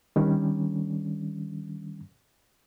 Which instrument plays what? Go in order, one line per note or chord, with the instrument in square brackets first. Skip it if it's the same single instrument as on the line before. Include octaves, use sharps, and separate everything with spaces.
[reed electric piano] D#3 G3 C#4 D4